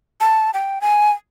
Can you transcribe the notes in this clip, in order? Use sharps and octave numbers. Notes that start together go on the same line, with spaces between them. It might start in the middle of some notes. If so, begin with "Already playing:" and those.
A5
G5
G#5